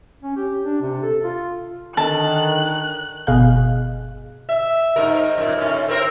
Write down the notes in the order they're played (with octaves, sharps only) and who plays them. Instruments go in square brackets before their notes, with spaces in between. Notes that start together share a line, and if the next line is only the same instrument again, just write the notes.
[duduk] C#4
G4
D4
C3
A4
F4
[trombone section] D3 D#3 [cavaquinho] A5 [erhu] F#6
[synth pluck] G1 B2 G#4 D#5 F5 F#6
[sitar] E5
G#2 D#4 A#4
F#2 A#2
A2 C#4
C4 A#4 C5